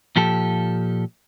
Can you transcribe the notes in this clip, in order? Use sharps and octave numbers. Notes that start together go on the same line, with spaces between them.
A#2 F3 G4 A4